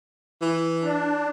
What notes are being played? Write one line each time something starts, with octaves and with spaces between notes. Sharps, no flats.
E3
D4